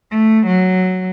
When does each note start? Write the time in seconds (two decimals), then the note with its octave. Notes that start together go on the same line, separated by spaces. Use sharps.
0.11 A3
0.46 F#3